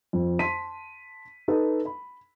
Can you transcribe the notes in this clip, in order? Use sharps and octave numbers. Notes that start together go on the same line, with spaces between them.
F2
A5 C6 B6 D#7
D#4 A4 B4
B5